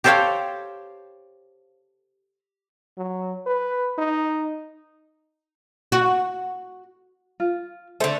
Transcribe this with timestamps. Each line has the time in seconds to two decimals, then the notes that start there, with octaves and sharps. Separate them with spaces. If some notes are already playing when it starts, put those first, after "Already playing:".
0.04 G4 A4 C5 C#5 F5 G5
2.98 F#3
3.46 B4
3.98 D#4
5.92 F#4
7.40 F4
8.00 D3 A3 C5